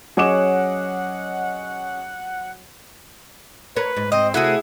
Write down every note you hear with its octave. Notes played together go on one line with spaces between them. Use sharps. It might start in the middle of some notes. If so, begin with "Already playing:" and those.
F#3 C#4 G#4 C#5 D#5 F#5 D6 E7
A#4 B4 C#5
G#2
C4 D#5
C3 A3 E4 F#4 G#4 F#5